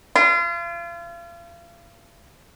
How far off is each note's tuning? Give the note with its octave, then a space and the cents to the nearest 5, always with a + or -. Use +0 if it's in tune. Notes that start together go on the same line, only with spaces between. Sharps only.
F4 -35